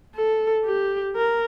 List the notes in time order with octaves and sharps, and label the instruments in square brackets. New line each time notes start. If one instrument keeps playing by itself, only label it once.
[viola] A4
G4
A#4